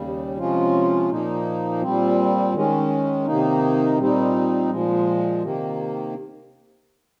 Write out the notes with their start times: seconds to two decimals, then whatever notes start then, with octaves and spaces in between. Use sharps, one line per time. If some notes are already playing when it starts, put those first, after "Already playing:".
Already playing: D#2 C#3 G3
0.37 C3 F3 G#3 C#4 F4
1.09 A#2 F3 A#3 D#4
1.82 A#2 G3 C4
2.54 D#3 G#3 C#4
3.26 C3 D#3 A#3 D#4
3.98 A#2 G3 C4 D#4
4.70 A#2 F3 G#3
5.42 C3 D#3 A#3